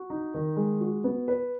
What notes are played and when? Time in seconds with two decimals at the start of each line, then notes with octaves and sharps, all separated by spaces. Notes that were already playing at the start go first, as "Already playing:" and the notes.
Already playing: F#4
0.10 D#4
0.34 D#3
0.56 G#3
0.81 F#4
1.04 B3
1.28 B4